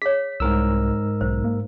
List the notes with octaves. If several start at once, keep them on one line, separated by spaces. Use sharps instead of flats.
G#4 C#5 B6
C2 G#2 A#4 E6
B1 C5
A#3